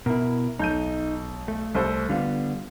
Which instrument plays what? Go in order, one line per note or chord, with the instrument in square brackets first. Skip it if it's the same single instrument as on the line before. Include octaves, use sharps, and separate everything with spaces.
[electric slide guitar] B2 E4 [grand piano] A#4
[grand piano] B1 G6 D#7 [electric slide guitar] D#4
[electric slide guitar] A3
[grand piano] C2 A4 C5
[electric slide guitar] D3 G3 B3 [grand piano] F4